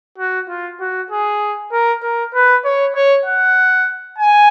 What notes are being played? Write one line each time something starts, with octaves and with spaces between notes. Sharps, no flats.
F#4
F4
F#4
G#4
A#4
A#4
B4
C#5
C#5
F#5
G#5